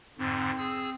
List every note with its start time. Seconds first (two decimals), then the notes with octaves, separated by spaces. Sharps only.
0.18 F2 G#2 D3 C4
0.58 G#4 E6